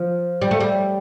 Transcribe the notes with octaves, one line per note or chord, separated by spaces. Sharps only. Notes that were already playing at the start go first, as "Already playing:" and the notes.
Already playing: F3
G3
A3
G3